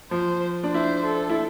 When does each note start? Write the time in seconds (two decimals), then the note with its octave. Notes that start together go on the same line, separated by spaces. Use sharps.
0.11 F3 C5
0.63 D4
0.74 E4 C5
1.06 A4
1.29 E4